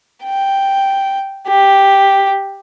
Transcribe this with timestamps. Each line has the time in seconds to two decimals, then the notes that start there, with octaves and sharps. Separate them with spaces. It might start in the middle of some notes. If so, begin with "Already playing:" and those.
0.24 G5
1.48 G4